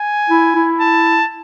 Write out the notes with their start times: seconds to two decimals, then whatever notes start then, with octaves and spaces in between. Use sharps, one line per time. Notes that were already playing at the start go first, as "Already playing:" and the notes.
Already playing: G#5
0.29 E4
0.55 E4
0.81 A5